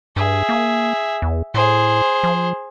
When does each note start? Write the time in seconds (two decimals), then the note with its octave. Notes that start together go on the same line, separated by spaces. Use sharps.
0.16 G2 G#4 E5
0.49 A#3
1.22 E2
1.54 A2 G#4 C5
2.23 F3